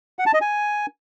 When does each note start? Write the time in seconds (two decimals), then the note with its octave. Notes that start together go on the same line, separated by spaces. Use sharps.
0.19 F#5
0.26 A5
0.34 D#5
0.41 G#5